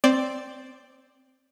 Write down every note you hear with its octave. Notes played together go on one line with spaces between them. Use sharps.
C4 D5 D7